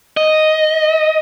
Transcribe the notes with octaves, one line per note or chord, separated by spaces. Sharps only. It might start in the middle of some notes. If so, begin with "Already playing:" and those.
D#5